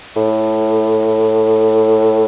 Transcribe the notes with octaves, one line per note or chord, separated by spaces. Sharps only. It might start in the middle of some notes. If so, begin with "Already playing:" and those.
A2